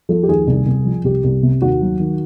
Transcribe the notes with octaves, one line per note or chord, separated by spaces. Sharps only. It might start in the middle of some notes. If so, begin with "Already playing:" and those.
F3 A4
G4
D#2 G#4
C2
C2
F3
C2 G4
C2
C3
D#2 F#4
F#3
D#3